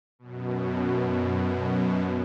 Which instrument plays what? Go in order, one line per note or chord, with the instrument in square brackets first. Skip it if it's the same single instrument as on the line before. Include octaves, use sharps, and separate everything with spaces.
[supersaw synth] F#2 B2